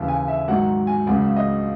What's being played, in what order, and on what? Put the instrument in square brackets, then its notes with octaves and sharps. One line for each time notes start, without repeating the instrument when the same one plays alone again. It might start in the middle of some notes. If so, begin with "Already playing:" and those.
Already playing: [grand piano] D#2 C#3 E3
G#5
E5
G#2 D#3 F#3 F#5
G#5
C#2 C#3 F#3 F#5
D#5